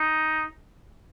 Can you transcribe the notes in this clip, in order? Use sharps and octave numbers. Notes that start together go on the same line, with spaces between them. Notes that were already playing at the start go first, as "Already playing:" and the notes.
Already playing: D#4